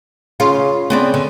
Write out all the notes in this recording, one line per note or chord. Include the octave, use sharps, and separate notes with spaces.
C#3 F4
C#3 B3 C4 D5
D3